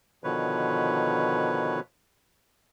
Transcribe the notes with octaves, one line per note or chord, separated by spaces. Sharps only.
B2 D3 D#3 F3 B4 C#5